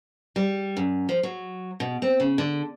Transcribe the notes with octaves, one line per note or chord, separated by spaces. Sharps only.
G3
F#2
F3
F#3
B2
C4
C#3
D3